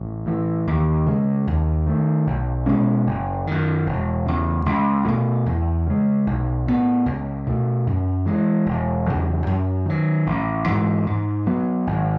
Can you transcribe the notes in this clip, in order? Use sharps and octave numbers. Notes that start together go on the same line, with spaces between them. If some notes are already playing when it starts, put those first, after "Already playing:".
Already playing: A1
A2 E3
D#2
C#3 G#3
D#2
D#3 A3
B1
B2 G#3 C#4
F#1
F#2 D#3
E1
E2 C#3
C#2
B2 A3
E2
C#3 G#3
B1
A2 E3 B3
C#2
B2 A3
F#2
E3 G#3
E1
E2 C#3 F#3
F#2
D#3 F#3
A1
G#2 E3
G#2
F#3 B3
G#1